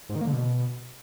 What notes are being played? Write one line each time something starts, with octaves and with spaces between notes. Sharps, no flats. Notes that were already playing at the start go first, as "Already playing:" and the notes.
G#2
D#3
A#3
D3
B2